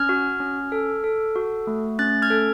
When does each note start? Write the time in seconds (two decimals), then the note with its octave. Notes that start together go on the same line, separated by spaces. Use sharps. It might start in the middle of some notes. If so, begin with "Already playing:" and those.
Already playing: C#4 F6 G#6
0.09 F#4
0.40 C#4
0.72 A4
1.04 A4
1.36 F#4
1.67 A3
1.99 C#4 F#6 A6
2.22 F6 G#6
2.30 A4